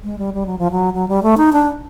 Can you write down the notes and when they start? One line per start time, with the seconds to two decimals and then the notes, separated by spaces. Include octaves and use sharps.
0.04 G#3
0.18 G3
0.34 G3
0.46 F#3
0.58 F3
0.71 F#3
0.94 F#3
1.08 G3
1.23 A3
1.37 D#4
1.53 D4